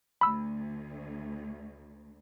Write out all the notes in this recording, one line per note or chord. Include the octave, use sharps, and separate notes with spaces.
D2 B5 E6